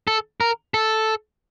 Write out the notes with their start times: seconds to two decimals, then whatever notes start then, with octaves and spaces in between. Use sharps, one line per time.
0.08 A4
0.41 A#4
0.74 A4